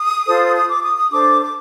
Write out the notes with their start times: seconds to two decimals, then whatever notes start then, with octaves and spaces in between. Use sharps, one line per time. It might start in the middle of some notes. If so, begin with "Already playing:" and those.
Already playing: D#6
0.27 F4 A4 C5
0.56 D#6
0.69 D6
0.83 D#6
0.97 D#6
1.11 D4 A4 C5 D6
1.41 D6